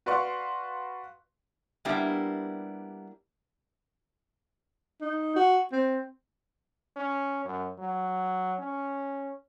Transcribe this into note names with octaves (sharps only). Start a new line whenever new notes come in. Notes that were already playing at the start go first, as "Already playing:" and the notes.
F#4 B4 D5 F5 C6 C#6
G3 A#3 B3 D4 E4 G4
D#4
F#4
C4
C#4
F#2
F#3
C#4